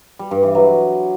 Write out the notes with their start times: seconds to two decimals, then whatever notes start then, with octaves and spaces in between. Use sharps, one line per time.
0.19 G3
0.31 G2
0.43 E3
0.55 F#3